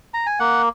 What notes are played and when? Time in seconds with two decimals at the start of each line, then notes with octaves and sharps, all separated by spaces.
0.14 A#5
0.26 G#5
0.39 A#3 F#5